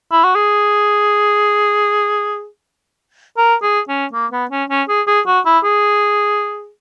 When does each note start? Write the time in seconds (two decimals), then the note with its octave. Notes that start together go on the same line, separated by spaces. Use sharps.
0.12 E4
0.24 F#4
0.35 G#4
3.37 A#4
3.62 G#4
3.88 C#4
4.13 A#3
4.32 B3
4.51 C#4
4.70 C#4
4.89 G#4
5.07 G#4
5.27 F#4
5.46 E4
5.64 G#4